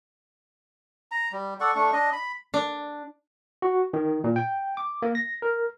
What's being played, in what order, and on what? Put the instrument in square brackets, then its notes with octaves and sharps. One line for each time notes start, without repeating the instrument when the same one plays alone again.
[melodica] A#5
G3
A4 D5 F#5 C#6
A3 D4 C#6
D4 D#5
B5
[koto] D4
[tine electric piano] F#4
D#3
A#2
G5
D6
A#3
A#6
A#4